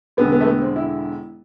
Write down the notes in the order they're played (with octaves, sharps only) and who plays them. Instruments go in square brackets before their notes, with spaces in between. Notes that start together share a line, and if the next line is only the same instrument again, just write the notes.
[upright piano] E1 E2 D3 B3
B3
A3
B3
C4
E4